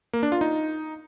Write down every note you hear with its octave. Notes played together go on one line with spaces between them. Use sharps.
A#3
D4
F4
D#4